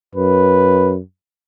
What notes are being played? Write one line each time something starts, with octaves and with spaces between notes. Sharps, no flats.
F#2 B4